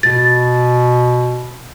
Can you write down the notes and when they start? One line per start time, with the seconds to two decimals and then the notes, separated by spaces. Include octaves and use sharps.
0.03 B2 A6